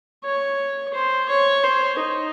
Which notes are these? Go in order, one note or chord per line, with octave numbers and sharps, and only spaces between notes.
C#5
C5
C#5
C5
D#4